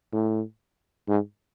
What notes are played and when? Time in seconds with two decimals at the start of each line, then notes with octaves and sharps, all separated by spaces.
0.12 A2
1.08 G#2